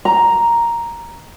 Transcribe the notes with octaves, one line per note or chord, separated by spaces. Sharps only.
A#5